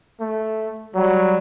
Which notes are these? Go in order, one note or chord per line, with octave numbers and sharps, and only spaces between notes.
A3
F#3 G3